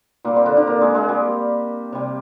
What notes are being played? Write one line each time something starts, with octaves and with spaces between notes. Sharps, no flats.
A#2 G3 A#3
C4
D3 D4
D3 D4
A#3 A#4
G#3 G#4
G#3 G#4
G3 G4
C3 G3